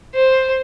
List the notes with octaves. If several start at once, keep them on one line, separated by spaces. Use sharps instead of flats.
C5